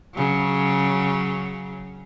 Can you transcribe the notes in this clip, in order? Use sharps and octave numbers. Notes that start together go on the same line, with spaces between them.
C#3 F#3